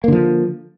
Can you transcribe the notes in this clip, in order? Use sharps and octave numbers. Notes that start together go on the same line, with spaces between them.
D3 F3 A#3